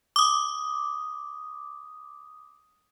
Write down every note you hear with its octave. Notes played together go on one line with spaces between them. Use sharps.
D6 D#6